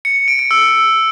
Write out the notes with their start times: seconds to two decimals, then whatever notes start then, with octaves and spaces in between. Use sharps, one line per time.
0.05 C#7
0.16 C#7
0.28 D7
0.39 C#7
0.51 E6